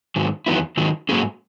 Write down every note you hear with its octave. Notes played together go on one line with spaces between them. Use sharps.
G#2 D#3 F#3
E2 D#3 F#3 B3 E4
G#2 D#3 F#3
G#2 F#3 A#3 C#4 G#4